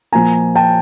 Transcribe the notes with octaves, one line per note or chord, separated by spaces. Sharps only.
A#2 F3 A#3 G#5 A#5
G5 A5